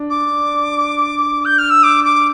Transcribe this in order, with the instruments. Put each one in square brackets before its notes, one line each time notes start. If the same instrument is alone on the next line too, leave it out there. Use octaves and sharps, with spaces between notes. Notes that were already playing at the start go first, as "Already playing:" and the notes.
Already playing: [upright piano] D4
[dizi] D6
G6
F6
E6
D6
D6